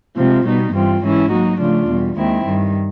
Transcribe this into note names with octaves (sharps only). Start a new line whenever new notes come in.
C3 F3 G#3 C4
B2 G3 B3 D#4
G2 E3 G3 C4 F4
G#2 E3 G#3 C#4 E4
F#3 A#3 D#4 F#4
C#3 F3 A3 D4 F4
E2 B2 G3
D#2 D#3 G#3 C4 E4
G2 D#3 G3